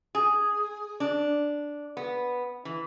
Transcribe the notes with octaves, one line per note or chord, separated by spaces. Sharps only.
G#4
D4
B3
E3